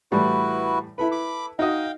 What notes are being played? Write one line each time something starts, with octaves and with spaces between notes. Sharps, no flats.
A2 E3 G3 E4 F#4 B4
E4 A4 B4 B5
B5 D6
D#4 F#4 D#5 F5 G5